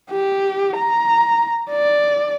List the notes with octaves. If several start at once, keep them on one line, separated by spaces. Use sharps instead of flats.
G4
A#5
D5